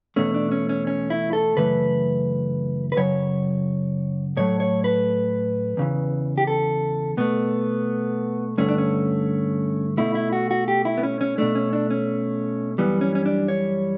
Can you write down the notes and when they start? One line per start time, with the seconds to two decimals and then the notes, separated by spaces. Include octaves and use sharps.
0.16 E2 B2 A3 C#4
0.34 D4
0.52 C#4
0.69 C#4
0.87 C#4
1.10 E4
1.33 A4
1.56 F#2 C#3 E3 A3 B4
2.92 B4
2.97 F#2 C#3 F#3 C#5
4.37 A2 F#3 A3 C#5
4.60 C#5
4.84 B4
5.77 E2 C#3 E3
6.38 G4
6.47 A4
7.17 B2 A3 B3
8.58 G2 D3 A3 C#4
8.68 D4
8.78 C#4
9.97 B2 A3 E4
10.15 E4
10.33 F#4
10.51 F#4
10.68 G4
10.85 E4
10.97 B3
11.03 C#4
11.21 C#4
11.38 B2 A3 D4
11.55 C#4
11.73 D4
11.90 C#4
12.78 F#2 E3 G3 B3
13.01 C#4
13.15 C#4
13.26 D4
13.48 C#5